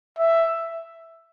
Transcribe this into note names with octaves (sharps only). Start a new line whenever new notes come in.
E5